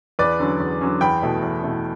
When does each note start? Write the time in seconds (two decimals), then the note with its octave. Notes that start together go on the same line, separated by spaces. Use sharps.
0.19 E2 B4 D5
0.39 D3 F#3 C#4
0.60 E2
0.81 D3 F#3 C#4
1.01 E2 G5 B5
1.22 B2 A3 E4
1.43 E2
1.63 B2 A3 E4